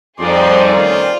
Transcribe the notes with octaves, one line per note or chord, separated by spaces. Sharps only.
F2 G3 D#4 G#4 C5 D5 C6
D#3 A3 C#4 F4